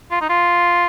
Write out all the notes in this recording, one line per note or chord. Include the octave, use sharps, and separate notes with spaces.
F4
D#4
F4